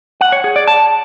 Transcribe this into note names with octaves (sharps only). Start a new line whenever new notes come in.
F#5
C#5
G#4
D5
A5